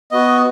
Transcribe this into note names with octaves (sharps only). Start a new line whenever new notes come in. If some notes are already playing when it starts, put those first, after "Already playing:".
B3 F#4 D#5